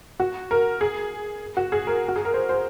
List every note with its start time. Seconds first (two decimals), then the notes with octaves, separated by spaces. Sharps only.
0.20 F#4
0.51 A#4
0.81 G#4
1.57 F#4
1.72 G#4
1.87 A#4
2.08 F#4
2.16 G#4
2.25 A#4
2.34 C5
2.49 C5